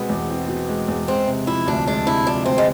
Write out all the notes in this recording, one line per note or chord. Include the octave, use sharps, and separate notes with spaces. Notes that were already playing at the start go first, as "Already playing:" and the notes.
Already playing: B2 G#3 B3 C4
E2
C4
B2
G#3
E2
G#3 C4
C3
F3 E4
D2 D4
G#3 D4
C3 E4
F3 D4
D2 C4
G#3